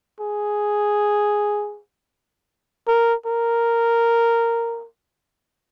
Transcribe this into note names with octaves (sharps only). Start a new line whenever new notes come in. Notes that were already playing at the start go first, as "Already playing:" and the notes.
G#4
A#4
A#4